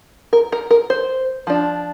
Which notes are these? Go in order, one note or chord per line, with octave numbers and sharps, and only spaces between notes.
A#4
A#4
A#4
C5
F3 D4